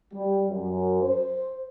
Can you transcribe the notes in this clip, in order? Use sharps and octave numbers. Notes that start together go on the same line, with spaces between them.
G3
F#2
C5